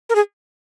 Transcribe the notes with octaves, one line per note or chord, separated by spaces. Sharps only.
A#4
G#4